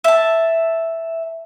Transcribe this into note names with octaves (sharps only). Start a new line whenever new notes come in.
E5 A5